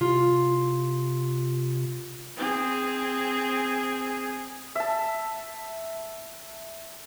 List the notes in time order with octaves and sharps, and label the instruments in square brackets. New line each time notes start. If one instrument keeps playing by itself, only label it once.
[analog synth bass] C3 [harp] F4
[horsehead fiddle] C4 G#4
[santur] E5 A5